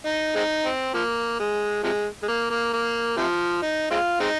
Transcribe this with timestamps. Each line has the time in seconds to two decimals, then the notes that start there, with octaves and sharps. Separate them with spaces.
0.05 D#4
0.36 G#3 C4 D#4
0.65 C4
0.94 F3 A#3
1.40 G#3
1.83 C3 F3 G#3
2.23 G#3
2.28 A#3
2.50 A#3
2.73 A#3
3.17 C3 F3
3.62 D#4
3.91 G#3 C4 F4
4.20 G#3 C4 D#4